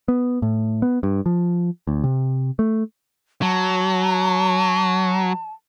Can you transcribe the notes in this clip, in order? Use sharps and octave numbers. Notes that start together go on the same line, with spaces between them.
B3
A2
B3
G2
F3
D2
C3
A3
F#3 A5